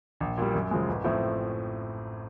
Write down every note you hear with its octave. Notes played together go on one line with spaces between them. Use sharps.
A#1
A#2 G3
F#2
C#3 F3 G#3
A1
A2 F3 A3 C4